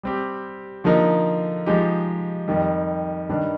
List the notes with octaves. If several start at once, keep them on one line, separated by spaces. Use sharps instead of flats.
G3 C4 G4
D3 F3 A#3 D#4 A#4
F3 G#3 D#4 G4
F2 D#3 G3
G2 D#3 G3 D4